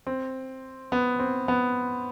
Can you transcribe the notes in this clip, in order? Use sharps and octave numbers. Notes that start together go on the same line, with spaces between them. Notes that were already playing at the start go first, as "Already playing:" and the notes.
C4
B3
C4
B3